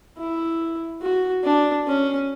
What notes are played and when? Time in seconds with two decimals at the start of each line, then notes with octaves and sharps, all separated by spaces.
0.18 E4
1.02 F#4
1.44 D4
1.87 C#4